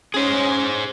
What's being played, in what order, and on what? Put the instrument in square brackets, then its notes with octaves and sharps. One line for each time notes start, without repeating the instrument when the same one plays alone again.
[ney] C#4 [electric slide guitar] G#4 C5